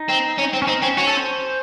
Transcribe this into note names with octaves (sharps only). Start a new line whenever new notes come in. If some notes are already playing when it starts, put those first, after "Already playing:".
Already playing: D#4
C4
C#4
C4
C#4
C4 D#4
C4 C#4
C#4 F#4
A4
C5